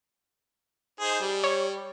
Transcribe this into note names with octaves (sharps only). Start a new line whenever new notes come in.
D#4 G#4 C5
G3
C#5